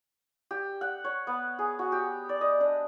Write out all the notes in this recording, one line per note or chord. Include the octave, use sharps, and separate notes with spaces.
G4
F#5
C#5
B3
G#4
F#4
G4
D5
D#5
D4